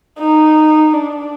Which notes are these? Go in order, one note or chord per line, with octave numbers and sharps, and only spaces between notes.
D#4
D4